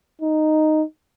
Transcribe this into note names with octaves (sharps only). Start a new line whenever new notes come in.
D#4